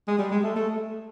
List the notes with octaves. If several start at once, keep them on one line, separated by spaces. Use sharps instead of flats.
G#3
G3
G#3
A3
A3